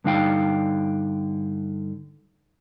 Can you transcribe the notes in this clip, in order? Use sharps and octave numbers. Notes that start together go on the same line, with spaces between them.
G2 D3 D#4 F5 G5